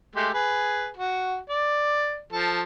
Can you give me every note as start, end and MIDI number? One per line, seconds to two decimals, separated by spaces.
0.15 0.29 56
0.15 0.29 57
0.15 0.29 67
0.34 0.88 68
0.34 0.88 71
0.97 1.39 66
1.50 2.20 74
2.32 2.62 53
2.32 2.62 69